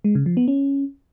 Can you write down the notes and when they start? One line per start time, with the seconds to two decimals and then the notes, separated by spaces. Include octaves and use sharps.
0.04 G#3
0.15 C#3
0.26 F3
0.37 B3
0.48 C#4